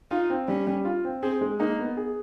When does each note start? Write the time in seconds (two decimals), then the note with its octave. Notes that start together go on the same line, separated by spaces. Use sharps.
0.11 D#4 F4
0.30 C4
0.48 G3 C#4
0.67 G3
0.85 F4
1.05 C4
1.23 C4 G#4
1.41 G#3
1.60 A#3 D#4
1.79 B3
1.97 G#4